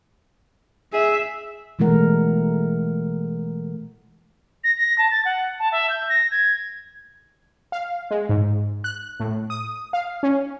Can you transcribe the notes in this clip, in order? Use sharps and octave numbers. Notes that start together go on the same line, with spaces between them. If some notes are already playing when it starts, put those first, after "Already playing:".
G#4 E5
B2 E3 G#3 A3 A#4 F#5
A#6
A#6
A5
A6
F#5
A5
E5
G6
A#6
G#6
F5
G#3
G#2
F#6
A2
D#6
F5
C#4